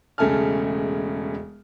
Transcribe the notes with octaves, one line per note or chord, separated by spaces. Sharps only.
E1 C#3 A3 G#5 A5 F6